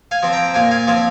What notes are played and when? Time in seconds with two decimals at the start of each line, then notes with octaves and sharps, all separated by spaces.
0.11 F5 G#5
0.23 F3 C4
0.33 G5 A#5
0.54 A#2 F5 G#5
0.71 F5 G#5
0.87 F3 C4 F5 G#5